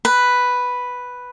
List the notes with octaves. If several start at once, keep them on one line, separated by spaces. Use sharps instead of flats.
B4